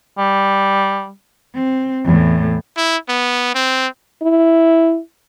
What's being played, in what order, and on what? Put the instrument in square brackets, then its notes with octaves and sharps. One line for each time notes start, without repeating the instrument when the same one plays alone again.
[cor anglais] G3
[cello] C4
E2 A2
[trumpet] E4
B3
C4
[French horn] E4